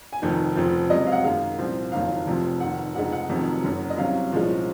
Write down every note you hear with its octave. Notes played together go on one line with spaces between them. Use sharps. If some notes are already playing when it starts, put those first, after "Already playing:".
G#5
F1 F2 D#3
F1 F2 C#3 F3
C#2 C3 F#3 D#5
F5
F#5
F#2 D#3 G#3 F5
C2 A#2 F3 C4
F#1 F2 D#3 F#3 F5
F1 F2 C3 F3 C4
F1 F2 D#3 F#5
F1 F2 C#3 G#3 D#4 F#5
F#5
F1 F2 C3 D#3 F#3
F#1 F#2 C#3 F#3
D#5
C2 C3 F#3 C#4 F5
C2 A#2 F3 G#3 C#4